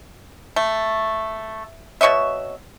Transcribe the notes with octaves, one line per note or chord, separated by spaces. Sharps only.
A3
B2 C#5 D#5 E5